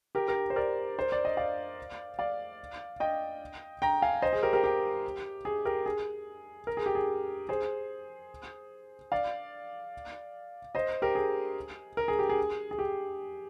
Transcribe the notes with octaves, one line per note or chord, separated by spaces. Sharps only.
G4 A#4
G4 A#4
C5
A#4 D5
C5
D5
D#5
D5 F5
D5 F5
D#5 G5
G5 A#5
F5 G#5
C5 D#5
G#4
G4 A#4
G4 A#4
G4
G#4
G4 A#4
G#4
A#4
G#4
G4
G#4
G#4 C5
D5 F5
C5 D#5
G4 A#4
G#4
A#4
G#4
G4
G#4
G#4
G4